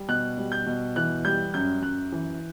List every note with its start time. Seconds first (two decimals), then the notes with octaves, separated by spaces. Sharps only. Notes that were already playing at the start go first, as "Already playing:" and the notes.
Already playing: G3
0.08 B2 F#6
0.38 G3
0.52 G6
0.66 B2
0.96 E3 F#6
1.25 G3 G6
1.54 F#2 G6
1.82 F#2 F#6
2.12 E3